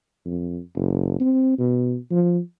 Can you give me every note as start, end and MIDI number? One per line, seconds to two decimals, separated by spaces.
0.25 0.60 41
0.76 1.19 30
1.20 1.58 60
1.59 1.96 47
2.11 2.39 53